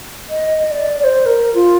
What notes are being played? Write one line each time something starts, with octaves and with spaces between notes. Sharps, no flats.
D#5
D5
D5
C5
A#4
F4